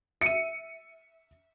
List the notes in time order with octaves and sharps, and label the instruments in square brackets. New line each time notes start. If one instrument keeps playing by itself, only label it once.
[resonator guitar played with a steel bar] E5 [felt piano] C#7 D#7